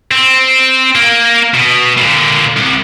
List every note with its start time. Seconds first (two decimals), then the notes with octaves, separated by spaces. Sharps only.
0.11 C4
0.95 A#3
1.54 B2
1.97 A#2 D3
2.57 C2